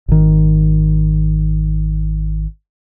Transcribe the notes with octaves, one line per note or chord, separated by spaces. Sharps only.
G#1 D#3